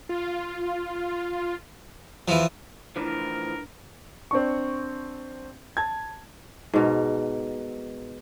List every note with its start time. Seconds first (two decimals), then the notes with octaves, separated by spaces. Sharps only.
0.09 F4
2.28 E2 E3 F3
2.96 A2 E3 F3 D4 A#4 B4
4.31 C4 D4 C#6
5.77 A5 G#6
6.74 G#2 B2 A#4